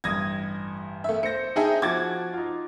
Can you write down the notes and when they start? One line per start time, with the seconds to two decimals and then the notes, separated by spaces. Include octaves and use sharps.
0.04 A1 G2 D#6 G#6 A#6
1.04 A3 E5
1.23 C5 A#6 C#7
1.56 D#4 G#4 C5 E5 G5 A5
1.82 F3 F#4 D6 G#6 A6
2.33 D#4 F4